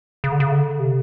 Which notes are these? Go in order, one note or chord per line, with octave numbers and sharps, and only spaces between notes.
C#3
D3
C#3
D3
C3